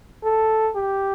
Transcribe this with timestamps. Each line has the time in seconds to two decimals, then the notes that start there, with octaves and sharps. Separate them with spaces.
0.23 A4
0.75 G4